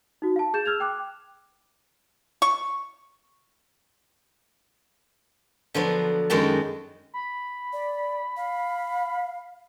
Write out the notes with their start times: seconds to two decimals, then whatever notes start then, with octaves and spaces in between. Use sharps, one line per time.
0.22 D#4 F#4
0.36 F5 A5
0.54 G#4 G6 A6 E7
0.66 E6 F6 G#6 F7
0.80 G5 D6 F#6
2.42 C#6
5.74 D3 F3 F#3 B3
6.30 F#2 D#3 G#3 F#4 G5 A5
7.14 B5
7.73 D5
8.37 F5